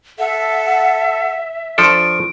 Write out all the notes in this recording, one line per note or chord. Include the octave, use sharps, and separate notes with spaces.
A4 E5 F#5
F3 D4 A4 C#6 D7